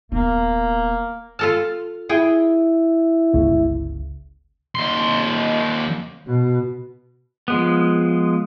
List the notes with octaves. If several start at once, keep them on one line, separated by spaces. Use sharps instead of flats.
D#1 A#3 B3
F4 A4 A5 F6
E4 G#4 G5
G1 C#2 C#3
D#2 C6
B2
F3 G#3 B3